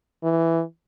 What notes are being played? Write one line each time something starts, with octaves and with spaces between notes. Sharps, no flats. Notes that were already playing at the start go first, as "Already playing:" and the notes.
E3